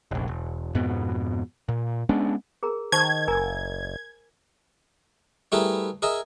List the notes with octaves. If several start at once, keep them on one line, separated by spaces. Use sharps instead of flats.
F1 A#1
E1
F2 G#2 B2 B3
A#2
G#3 B3 C#4 D4
G#4 A#4 A#5
D#3 C5 A5 C#6 G#6
F#1 A#4 G#5 A#5
G3 A3 E4 G#4 A#4 B4
G#4 A#4 D#5 E5 G#5